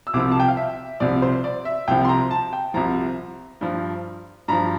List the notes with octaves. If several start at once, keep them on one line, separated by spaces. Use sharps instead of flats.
E6
C2 C3 F3 D6
A5
G5
F5
E5
C2 C3 F3 D5
C5
D5
E5
C2 C3 F3 G5
C6
A#5
A5
G5
C2 C3 F3 A#5
G2 F3
G2 F3 A#5